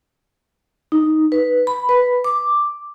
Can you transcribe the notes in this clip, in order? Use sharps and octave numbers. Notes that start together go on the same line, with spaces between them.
D#4
B4
B5
B4
D6